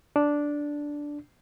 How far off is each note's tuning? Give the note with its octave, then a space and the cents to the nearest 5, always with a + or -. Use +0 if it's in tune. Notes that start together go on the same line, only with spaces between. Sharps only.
D4 -5